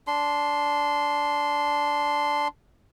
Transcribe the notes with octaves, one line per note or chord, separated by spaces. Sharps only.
D4 C6